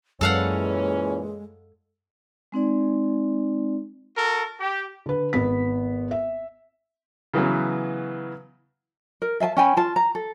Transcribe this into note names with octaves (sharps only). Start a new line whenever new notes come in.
F#2 A#2 E3 G#3 C#4 A4 F5 F#5
G#3 C4 D#4 D5
F#4 A4 A#4
G4
D3 B4
G#1 B3 B6
E5
C#3 E3 F#3 B3
A#4
E5 F5 G#5 A5
C#4 G5 G#5 B5
F4 A5
A#5
A4